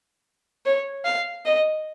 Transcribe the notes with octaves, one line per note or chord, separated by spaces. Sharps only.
C#5
F5
D#5